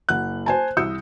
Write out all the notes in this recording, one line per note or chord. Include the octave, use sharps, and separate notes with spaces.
F#1 F#5 F#6
C5 G#5 A5
C2 D#6 E6 G6 C#7